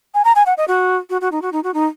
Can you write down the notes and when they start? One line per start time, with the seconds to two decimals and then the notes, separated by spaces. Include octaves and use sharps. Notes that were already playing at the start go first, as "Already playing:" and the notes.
0.14 G#5
0.25 A#5
0.36 G#5
0.46 F#5
0.57 D#5
0.68 F#4
1.10 F#4
1.21 F#4
1.32 D#4
1.42 F#4
1.52 D#4
1.64 F#4
1.74 D#4